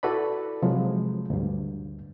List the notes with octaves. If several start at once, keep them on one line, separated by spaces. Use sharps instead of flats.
E4 F#4 A4 B4 D5 B5
C3 F3 F#3 G#3
D2 G2